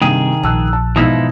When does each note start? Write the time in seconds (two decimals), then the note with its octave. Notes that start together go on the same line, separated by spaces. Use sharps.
0.02 G2 C3 D#3 G#4
0.43 A#1 A5 E6 F#6
0.73 A5
0.96 G#2 B2 E3 F3 D#4 E4